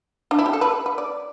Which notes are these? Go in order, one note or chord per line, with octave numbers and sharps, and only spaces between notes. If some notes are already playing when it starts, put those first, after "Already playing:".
D4
E4
G4
A4
B4
B4
D5